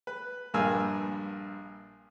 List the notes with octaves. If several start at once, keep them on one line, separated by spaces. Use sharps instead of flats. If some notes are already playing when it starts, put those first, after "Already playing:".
B4
A#1 G2 A#4 G#5 E6